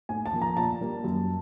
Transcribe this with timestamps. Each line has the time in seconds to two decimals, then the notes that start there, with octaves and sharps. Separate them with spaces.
0.09 A2 G#5
0.26 A5
0.33 F3 A#3
0.42 A#5
0.56 A#2 A5
0.81 G3 A#3
1.04 F#2